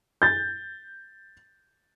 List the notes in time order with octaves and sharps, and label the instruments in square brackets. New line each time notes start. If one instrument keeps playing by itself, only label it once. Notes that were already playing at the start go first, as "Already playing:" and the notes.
[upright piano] G6 A6